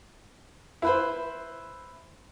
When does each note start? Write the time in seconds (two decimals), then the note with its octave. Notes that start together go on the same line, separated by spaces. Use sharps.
0.82 E4 B4 C5